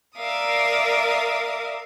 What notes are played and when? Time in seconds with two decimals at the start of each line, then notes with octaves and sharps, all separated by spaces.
0.17 A#4 D5 E5 F5 D#6